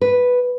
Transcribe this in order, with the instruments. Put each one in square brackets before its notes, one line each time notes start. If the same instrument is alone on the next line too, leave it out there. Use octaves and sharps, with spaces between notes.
[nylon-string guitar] B4